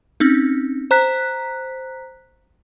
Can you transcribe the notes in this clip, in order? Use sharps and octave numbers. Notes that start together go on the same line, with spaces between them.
C4 C#4 D#4
C5 A#5 F#6 B6